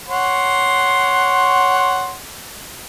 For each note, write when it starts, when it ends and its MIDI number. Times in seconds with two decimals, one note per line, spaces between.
0.08 2.16 73
0.08 2.16 78
0.08 2.16 84